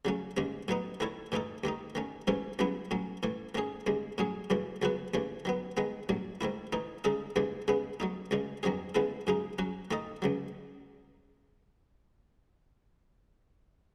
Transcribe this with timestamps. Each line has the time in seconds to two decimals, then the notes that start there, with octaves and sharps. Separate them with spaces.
0.05 C#3 F#3 A3 C#4
0.37 D#2 C#3 G#3 C#4
0.68 A2 F#3 B3 D#4
1.00 D#3 A3 E4 A4 C#5
1.32 A2 E3 A3 D#4 A4
1.64 D#2 D#3 A3 D#4
1.95 D#3 A3 C#4
2.27 A1 G#2 E3 A3 C#4
2.59 C#2 C#3 F#3 B3 E4
2.91 A2 F#3 C#4
3.23 A2 E3 A3
3.55 D#3 A3 C#4 G#4
3.87 D#2 C#3 G#3
4.18 A2 F#3 C#4 G#4
4.50 F#2 C#3 E3 A3
4.82 C#2 C#3 F#3 B3 F#4
5.14 D#2 C#3 E3 A3
5.45 D#3 F#3 B3
5.77 D#3 G#3 B3
6.09 A1 A2 F#3
6.41 G#2 D#3 A3 E4
6.73 E3 A3 D#4
7.04 C#3 G#3 D#4 A4 D#5
7.36 D#2 C#3 E3 G#3
7.68 C#3 G#3 B3
8.00 F#3 A3 D#4
8.31 C#2 C#3 G#3 C#4
8.63 E2 D#3 F#3 C#4 G#4
8.95 C#3 G#3 B3 E4 A4
9.27 F#2 C#3 G#3 D#4
9.59 F#3 C#4 F#4
9.91 D#3 A3 D#4 A4 D#5
10.22 C#2 C#3 F#3